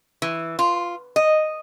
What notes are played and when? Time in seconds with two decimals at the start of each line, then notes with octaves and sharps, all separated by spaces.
0.22 E3
0.59 F4
1.16 D#5